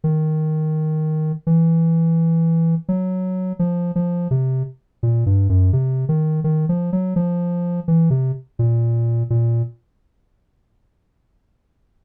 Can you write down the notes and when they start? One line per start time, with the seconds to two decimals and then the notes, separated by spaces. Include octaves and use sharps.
0.04 D#3
1.47 E3
2.89 F#3
3.59 F3
3.96 F3
4.31 C3
5.03 A#2
5.26 G2
5.49 F#2
5.73 C3
6.09 D#3
6.44 D#3
6.69 F3
6.93 F#3
7.16 F3
7.88 E3
8.10 C3
8.59 A#2
9.30 A#2